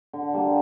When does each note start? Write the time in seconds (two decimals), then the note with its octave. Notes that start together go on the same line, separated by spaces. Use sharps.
0.13 D3
0.34 G3 A#3